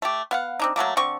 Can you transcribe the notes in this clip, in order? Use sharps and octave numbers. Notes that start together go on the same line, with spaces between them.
A3 G4
B3 F5 F#5
C4 D4 D#4
F#3 G3 A3 A#3
D3 C4 C#6